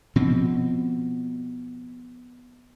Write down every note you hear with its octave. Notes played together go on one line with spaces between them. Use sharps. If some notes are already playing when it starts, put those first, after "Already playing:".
B2 F3 C4